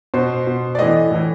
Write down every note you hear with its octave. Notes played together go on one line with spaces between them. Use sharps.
B2 C5
B2
D5
A2 E3 D#5
A2 E3